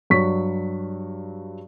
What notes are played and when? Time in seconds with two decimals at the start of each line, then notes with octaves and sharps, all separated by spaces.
0.10 G2 F#3 C#6 B6